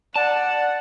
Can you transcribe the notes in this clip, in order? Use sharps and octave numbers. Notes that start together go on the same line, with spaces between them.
D5 F#5 A5